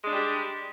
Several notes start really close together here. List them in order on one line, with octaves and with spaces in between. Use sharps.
G#3 D4 G3 G4